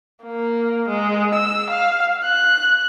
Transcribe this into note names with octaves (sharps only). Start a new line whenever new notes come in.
A#3
G#3
E6
F5
F#6